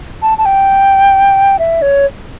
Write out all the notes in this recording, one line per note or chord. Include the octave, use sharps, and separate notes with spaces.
A5
A5
G5
E5
C#5